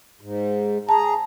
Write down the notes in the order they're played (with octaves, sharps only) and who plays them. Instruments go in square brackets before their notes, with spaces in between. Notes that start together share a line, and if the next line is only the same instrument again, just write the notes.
[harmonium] G#2
[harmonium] G#4 A#5 [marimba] A5